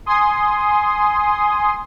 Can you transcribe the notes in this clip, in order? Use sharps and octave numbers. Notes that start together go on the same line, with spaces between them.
G#5 C6 D#6